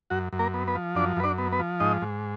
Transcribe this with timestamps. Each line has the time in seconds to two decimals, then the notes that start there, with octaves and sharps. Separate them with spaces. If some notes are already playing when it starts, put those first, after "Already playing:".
0.10 F#2 F#4
0.33 F#2
0.39 A#3 A#4
0.54 B3
0.68 B3 B4
0.75 F3
0.95 F#2 D4 D5
1.17 F#2 B4
1.24 D4 D5
1.38 B3
1.52 B3 B4
1.59 F3
1.80 G#2 D#4 D#5
2.02 G#2